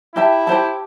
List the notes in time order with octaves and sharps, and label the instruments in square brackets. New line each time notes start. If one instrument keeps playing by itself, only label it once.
[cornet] E4 [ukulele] G4 E5 A5
[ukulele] G4 C5 A5